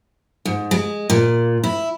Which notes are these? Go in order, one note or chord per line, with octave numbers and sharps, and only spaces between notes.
G#2
G#3
A#2
E4